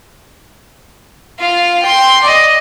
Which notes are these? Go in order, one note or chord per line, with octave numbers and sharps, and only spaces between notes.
F4 F5
G5 C6
D5 D#5